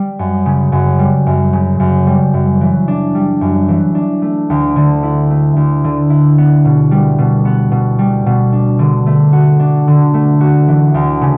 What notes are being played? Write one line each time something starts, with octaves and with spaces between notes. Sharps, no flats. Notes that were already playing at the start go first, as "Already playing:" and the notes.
Already playing: G3
F#2
C#3
F#2
G3
F#2
C#3
F#2
G3
F#2
E3
D4
G3
F#2
E3
D4
A3
D2
D3
E4
A3
D2
D3
E4
B3
B2
G3
B2
B3
B2
G3
B2
D4
D3
A3
F#4
D4
D3
A3
F#4
E3
D2
C#3